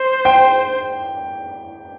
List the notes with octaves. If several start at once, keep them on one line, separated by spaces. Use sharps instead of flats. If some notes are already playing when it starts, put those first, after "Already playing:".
Already playing: C5
G5